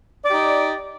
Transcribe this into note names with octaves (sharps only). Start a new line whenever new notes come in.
D#4 G4 D5